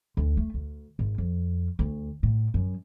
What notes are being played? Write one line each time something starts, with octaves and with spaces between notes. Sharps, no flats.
D2
A3
D2
G#1
F2
D2
A2
F#2